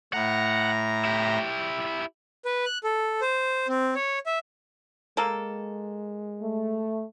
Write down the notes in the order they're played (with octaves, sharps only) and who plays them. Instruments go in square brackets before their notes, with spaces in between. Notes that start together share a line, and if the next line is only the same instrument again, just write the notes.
[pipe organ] A2 A#5 [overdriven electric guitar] F#5
[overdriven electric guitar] E4 G4
[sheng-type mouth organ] B4
F#6
A4
C5
C4
C#5
E5
[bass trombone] G#3 [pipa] A#3 A4
[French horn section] A3